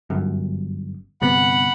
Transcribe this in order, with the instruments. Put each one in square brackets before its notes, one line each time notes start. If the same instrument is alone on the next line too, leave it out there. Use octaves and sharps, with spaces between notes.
[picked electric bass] G1 F#2
[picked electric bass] G1 C3 B3 [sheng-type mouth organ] F#5 B5